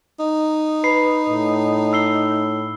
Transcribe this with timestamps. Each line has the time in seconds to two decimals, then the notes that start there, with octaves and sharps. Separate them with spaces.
0.19 D#4
0.84 B4 B5 C7
1.29 A2
1.93 E6 C7 G7